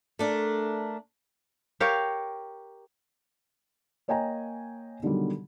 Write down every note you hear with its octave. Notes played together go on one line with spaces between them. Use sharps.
A3 D4 A#4
G4 A#4 C#5 F5
A#3 C#5 D#5 G5 G#5 A#5
B2 D3 D#3 F#3 G3